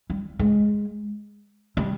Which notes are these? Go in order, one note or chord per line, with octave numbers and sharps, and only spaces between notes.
G3
G#3
G3